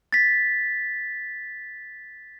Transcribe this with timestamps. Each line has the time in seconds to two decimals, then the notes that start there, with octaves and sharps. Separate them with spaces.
0.13 A6 B6